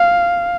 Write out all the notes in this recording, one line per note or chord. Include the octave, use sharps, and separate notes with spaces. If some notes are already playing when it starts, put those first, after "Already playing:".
Already playing: F5